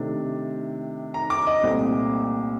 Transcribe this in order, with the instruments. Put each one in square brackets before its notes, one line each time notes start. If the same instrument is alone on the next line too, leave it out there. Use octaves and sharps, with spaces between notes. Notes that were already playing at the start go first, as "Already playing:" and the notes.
Already playing: [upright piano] C3 D#3 A3 D4
A#5
D6
D#5
C2 A#2 A3 C4